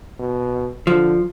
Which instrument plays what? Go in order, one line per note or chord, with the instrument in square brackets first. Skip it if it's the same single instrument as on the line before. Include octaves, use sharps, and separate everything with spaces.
[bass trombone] B2
[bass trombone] D3 [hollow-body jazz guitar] F3